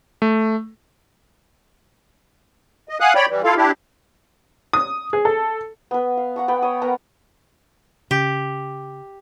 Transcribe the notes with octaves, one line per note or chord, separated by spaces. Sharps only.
A3
D#5
F5 F#5 G#5 D#6 F#6
C#5 D5 G5 B5
E3 G3
E4 F4 A4 F5
D4 E4 G4
D#6
G#4
A4
B3 B4
F5
F#5 A#5 C#6
B3 G5 B5
C#5 D#6
B3 A#4 F#5 A#5
C#3 G4